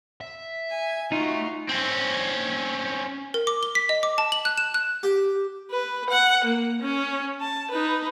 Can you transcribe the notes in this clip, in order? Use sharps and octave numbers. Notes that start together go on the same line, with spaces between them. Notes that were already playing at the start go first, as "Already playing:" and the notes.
E5
G#5
A3 D#4 F4 F#4 E5
C4 C#4
A#4
D6
G7
B6
D#5
D6
A5
F#7
F#6
E7
F#6
G4
B4
F#5
A#3
C#4
A5
D#4 B4